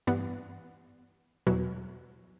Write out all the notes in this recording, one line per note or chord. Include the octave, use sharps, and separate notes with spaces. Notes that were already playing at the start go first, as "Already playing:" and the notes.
G2 E3 B3
E2 B2 F#3